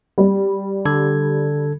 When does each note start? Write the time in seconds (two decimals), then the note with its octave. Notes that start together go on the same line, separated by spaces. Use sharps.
0.18 G3
0.85 D3 A4 G#6